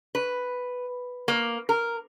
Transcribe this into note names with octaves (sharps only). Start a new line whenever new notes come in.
B4
A#3
A#4